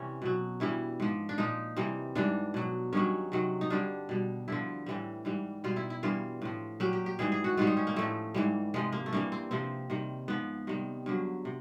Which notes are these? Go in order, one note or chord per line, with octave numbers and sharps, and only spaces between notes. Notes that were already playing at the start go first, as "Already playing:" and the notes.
Already playing: C3 E3 G3 C#4
B2 F#3
G2 E3 G3 E4
G#2 F3
D4
A#2 F3 D#4
C3 E3 G3
G#2 E3 G3 D4
B2 F#3
G2 D#3 F#3 C#4
C3 D#3 F#3
D#4
G2 D3 G3 D4
B2 G3
G2 D3 F3 E4
A2 E3 G3
G#2 E3 G3
B2 G3 F4
E4
E4
G2 E3 G3 F4
A2 F3
A#2 F#3 G4
G4
G4
G#2 E3 G3 G#4
G#4
F#4
G#2 D#3 G3 F4
D#4
C#4
A#3
A2 F3 A3
G#2 E3 G3
C3 F3 G#3
A#3
A3
G2 E3 G3 A#3
C4
C3 F3 C4
C3 D#3 G3
G#2 F3 B3
C3 D#3 G3
G2 D3 F#3
C3